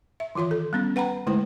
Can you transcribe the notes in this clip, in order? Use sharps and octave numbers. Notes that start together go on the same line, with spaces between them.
E5
D#3 E3 F4 C#5 C6
A4
G3 B3 C#4
B4 F#5 G5 A#5 B5
D3 G#3 A3 E4 B4 C5